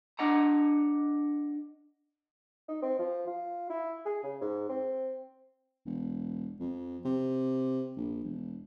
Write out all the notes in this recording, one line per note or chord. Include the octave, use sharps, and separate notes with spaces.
D4 D#5 F#5 A#5
D#4
C4
F3
F4
E4
G#4
C#3
G#2
C4
E1
F2
C3
A#1
E1